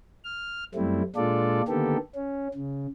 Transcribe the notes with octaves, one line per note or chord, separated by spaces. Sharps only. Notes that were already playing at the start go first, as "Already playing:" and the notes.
F6
F#2 G3 A3 C4 E4
A#2 G#3 D4 F4 A4 D5
D3 D#3 A#3 B3 G4 A4
C#4
C#3